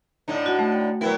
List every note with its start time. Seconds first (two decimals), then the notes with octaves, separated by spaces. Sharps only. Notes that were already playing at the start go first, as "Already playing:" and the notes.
0.28 A2 D3 D#4
0.46 F#4 F#5
0.59 A3
0.72 G5
1.01 F#3 B3 E4 A#4 G5